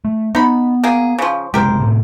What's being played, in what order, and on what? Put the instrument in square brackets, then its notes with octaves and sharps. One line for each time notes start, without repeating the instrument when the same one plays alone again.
[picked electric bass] A3
[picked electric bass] B3 [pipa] D#4 B5
[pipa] A#3 G#4
C#3 F3
[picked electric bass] F#1 C3 G#3 [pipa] G4 A#4 C5
[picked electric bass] A2 C3